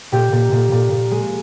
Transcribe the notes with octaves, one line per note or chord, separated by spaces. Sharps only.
A#2 G4
A#2
A#2
A#2
A#2
G#3